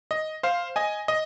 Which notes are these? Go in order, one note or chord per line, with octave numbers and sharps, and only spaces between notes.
D#5
C5 F5
D#5 G#5
D#5